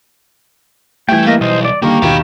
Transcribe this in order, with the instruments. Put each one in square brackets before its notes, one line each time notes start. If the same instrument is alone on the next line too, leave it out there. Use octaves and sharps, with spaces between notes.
[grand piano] E3 G3 [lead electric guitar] A3 [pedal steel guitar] G5 G#5
[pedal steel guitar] A#3 A#4 D#5
[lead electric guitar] B1 [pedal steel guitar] C5 D#5
[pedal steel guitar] D5
[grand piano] D3 D#3 G3 [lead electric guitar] A#3 [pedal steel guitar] G4 A#5 C#6
[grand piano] D#2 B2 D#3 [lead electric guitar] F5 B5